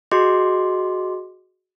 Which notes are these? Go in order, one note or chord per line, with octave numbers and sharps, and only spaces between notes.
F#4 G#4 D#5 C6 D6